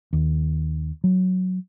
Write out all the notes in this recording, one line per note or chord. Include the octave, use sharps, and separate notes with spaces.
D#2
F#3